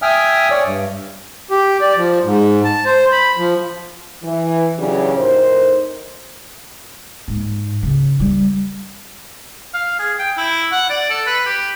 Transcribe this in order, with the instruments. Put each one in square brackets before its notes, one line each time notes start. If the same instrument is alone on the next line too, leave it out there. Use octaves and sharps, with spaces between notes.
[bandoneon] E5 G5 G#5 D#6 F6
C#5 D5
G2
[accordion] G4
D5
F3
G#2
A5
C5
B5
F3
[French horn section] E3
C#3 E3 F#3 C#4 D4 G4
F2 A2 D#4 A#4 C5
[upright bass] G#2
C#3
G3
[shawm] F5
G#4
G5
E4
F#5
D5
A4
B4
G4